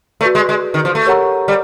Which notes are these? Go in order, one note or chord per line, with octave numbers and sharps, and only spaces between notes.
A3 F#4 B4 D5
G#3
G#3
D#3
F3
A3
G4 A#4 C#5 F#5 A#5
G3